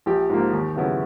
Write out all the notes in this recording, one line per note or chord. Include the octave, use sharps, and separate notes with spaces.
A#1 G4
G#2 F3 A#3
D#2
C#3 F#3 B3 E4